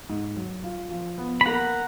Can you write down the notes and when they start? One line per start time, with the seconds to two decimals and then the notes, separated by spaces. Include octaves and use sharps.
0.09 G#2
0.36 F#3
0.64 F4
0.91 F3
1.18 B3
1.41 B5
1.46 A#3 F#5 A#5